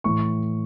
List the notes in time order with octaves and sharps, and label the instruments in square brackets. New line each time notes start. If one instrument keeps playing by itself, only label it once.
[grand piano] A2 E3 C#6